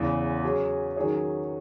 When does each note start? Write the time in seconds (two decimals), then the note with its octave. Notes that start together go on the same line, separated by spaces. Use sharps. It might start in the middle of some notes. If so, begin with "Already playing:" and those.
Already playing: E2 C#3 E3
0.44 F#3 C#4 G#4
0.96 D#3 F#3 C#4 G#4 C#5